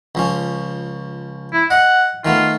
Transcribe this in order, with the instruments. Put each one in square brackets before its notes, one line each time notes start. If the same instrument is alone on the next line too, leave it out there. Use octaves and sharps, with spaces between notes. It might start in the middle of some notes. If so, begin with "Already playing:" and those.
[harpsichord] C#2 F3 C#4
[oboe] E4
[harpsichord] D#5 [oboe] F#5
[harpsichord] D#3 A3 B3 [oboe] F4